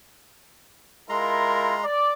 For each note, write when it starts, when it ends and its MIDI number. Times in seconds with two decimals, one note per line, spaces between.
1.09 1.85 56
1.09 1.77 64
1.09 1.77 65
1.09 1.77 70
1.09 1.85 82
1.09 1.85 84
1.83 2.12 74